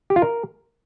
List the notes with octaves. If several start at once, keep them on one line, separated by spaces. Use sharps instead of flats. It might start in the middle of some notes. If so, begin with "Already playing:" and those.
G4
F4
A#4